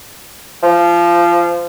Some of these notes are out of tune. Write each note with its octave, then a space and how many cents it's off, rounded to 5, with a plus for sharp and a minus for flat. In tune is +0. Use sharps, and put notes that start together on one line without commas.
F3 -20